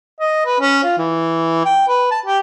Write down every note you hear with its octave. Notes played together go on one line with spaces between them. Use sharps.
D#5
B4
C#4
F4
E3
G5
B4
A5
G4